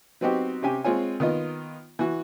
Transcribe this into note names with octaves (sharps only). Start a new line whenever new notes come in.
F#3 B3 C4 D#4 F#4 G4
C3 C#4 G4 G#5
G#3 C4 F4 C#5 G#5
D#3 B3 F4 D#5
E3 F#4